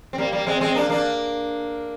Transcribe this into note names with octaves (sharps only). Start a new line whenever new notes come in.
C4
G3 A#3
G3 A#3
G#3 C4
G#3 C4
A#3 D4
A#3 D4